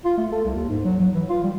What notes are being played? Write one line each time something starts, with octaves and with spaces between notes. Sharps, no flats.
F4
A3
A4
C2
D#2
G#2
F#3
F#3
E3
F4
G3